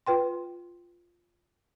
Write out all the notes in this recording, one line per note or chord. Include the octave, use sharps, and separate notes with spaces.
F4 B4 G5 C6